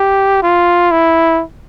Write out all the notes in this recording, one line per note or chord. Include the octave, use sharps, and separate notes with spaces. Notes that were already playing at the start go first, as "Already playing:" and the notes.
Already playing: G4
F4
E4